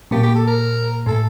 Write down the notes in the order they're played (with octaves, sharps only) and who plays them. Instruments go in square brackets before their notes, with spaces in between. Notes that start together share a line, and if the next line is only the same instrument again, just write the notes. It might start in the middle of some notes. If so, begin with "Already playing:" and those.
[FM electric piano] A#2 A#3 [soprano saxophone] G4
[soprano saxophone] G4
A4
A#4
[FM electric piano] A2 A3 [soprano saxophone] A4